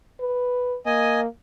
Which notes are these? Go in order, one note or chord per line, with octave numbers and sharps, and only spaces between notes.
B4
A#3 D#5 G#5